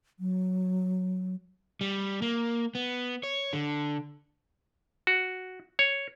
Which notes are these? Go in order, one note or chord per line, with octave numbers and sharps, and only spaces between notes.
F#3
G3
A#3
B3
C#5
D3
F#4
C#5